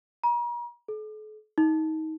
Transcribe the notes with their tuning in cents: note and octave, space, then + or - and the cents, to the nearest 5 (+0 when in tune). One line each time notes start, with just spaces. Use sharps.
A#5 +40
A4 -45
D#4 +25